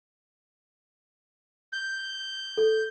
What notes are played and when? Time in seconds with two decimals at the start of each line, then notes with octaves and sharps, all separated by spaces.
1.73 G6
2.57 A4